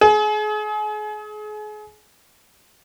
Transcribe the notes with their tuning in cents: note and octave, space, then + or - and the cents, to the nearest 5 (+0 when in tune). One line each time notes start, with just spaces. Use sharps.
G#4 +35